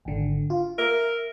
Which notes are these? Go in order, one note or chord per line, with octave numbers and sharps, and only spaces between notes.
G#1 D3
F4
A#4 E5